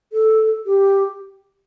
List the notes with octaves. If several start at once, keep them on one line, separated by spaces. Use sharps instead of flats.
A4
G4